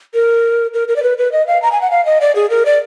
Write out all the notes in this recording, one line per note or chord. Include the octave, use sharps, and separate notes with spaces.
A#4
A#4
A#4
D5
B4
B4
D#5
F5
A#5
G#5
F#5
F5
D#5
D5
G#4
A#4
D5